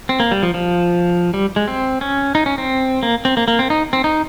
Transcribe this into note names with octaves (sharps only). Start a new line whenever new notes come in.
C4
A#3
G3
F3
F3
G3
G#3
C4
C#4
D#4
C#4
C4
A#3
C4
A#3
A#3
C4
D#4
C4
D#4